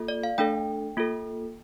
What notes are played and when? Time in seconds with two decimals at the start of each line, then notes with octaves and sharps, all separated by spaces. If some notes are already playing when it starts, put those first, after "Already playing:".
Already playing: A#3 F4 A4
0.08 D5
0.23 F5
0.38 A3 D4 A4 G5
0.97 A#3 F4 A4